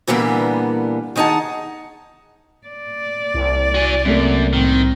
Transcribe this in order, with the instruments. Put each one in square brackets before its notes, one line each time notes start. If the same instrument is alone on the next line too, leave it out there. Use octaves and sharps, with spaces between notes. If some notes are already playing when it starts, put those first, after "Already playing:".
[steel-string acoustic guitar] A#2 D3 E3 G3 A#3 B3
D#3 B3 D#4 G#4 F#5 A5
[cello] D5
[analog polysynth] C2
[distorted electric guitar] F#4 G#5
[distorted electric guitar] F#2 [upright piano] C3 A3 A#3
[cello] A2 C4 [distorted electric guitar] D#3